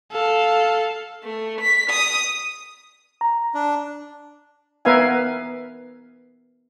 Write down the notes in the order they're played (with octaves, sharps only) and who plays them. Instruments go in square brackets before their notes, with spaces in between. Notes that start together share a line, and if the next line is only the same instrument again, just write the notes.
[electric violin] A4 F5
[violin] A3
B6
D#6
[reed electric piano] A#5
[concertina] D4
[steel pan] B3 A#4 B4 E5 F5 G#5